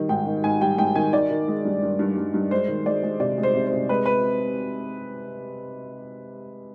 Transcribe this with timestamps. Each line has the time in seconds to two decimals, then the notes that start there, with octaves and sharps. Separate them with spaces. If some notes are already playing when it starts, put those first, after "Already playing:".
Already playing: D#3 G3
0.09 G#2 G5
0.26 D#3
0.44 G#2 G#5
0.61 G3 G5
0.78 G#2 G5
0.96 D#3 G#5
1.13 D#3 D5
1.30 D#3
1.48 G#3
1.65 G2
1.82 G2
1.99 G2
2.17 G2
2.34 G2
2.51 G#3 C5
2.68 D#3
2.86 G#3 D5
3.03 G#3
3.20 C3 D5
3.38 G#3
3.43 C5
3.55 C3
3.67 C5
3.73 C3
3.89 G#3 B4
4.06 B4